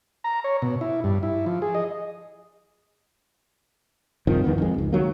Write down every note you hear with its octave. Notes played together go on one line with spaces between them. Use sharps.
A#5
C#5
B2
E4
G2
E4
F3
G#4
D#5
G2 C3 D#3 F3
E2 D#3 E3 B3
F2 D#3 G#3
C#2
D#3 F#3 A#3